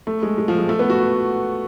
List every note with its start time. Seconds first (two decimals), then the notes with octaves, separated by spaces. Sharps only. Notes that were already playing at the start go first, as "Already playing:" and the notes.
0.07 A3
0.23 G#3
0.38 G#3
0.48 F3
0.59 G#3
0.69 A3
0.79 B3
0.90 F#4